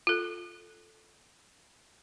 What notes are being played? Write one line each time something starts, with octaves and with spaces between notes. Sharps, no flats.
F4 A4